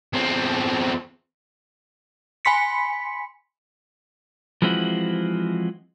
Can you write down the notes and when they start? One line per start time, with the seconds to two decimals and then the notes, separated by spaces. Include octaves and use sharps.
0.13 E2 C4
2.45 G#5 B5 C6 B6 C#7
4.62 E3 F3 G#3 C4 E4 F#4